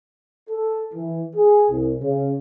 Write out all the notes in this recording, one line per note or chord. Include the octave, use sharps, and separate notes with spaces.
A4
E3
G#4
C2
C#3